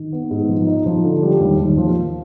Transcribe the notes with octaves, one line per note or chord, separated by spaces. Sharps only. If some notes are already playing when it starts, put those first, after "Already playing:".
Already playing: D#3
B3
G#2
F3
D#4
F3
D3
G3
D#2
D#2
F3